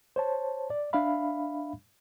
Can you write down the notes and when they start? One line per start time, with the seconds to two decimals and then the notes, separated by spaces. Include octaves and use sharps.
0.16 C5 C#5 A5
0.70 D5
0.93 D4 E5 F5 B5